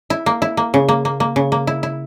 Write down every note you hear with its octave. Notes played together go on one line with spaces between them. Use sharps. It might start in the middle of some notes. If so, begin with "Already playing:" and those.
E4
A#3
E4
A#3
C#3
A#3
A#3
A#3
C#3
A#3
E4
E4